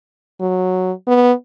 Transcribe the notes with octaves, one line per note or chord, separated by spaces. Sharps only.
F#3
B3